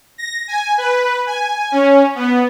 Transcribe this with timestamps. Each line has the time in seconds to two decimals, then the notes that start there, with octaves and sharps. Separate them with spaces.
0.18 A#6
0.48 G#5
0.78 B4
1.27 G#5
1.72 C#4
2.15 B3